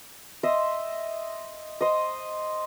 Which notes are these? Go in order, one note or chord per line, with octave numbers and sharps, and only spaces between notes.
D#5 E5 C6
C5 D#5